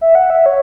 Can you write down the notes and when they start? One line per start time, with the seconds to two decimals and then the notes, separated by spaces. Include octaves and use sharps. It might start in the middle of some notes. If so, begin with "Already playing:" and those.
0.01 E5
0.15 F#5
0.30 E5
0.46 C#5